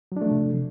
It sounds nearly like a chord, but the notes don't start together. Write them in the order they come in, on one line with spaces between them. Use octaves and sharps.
F#3 D4 A3 F3 C3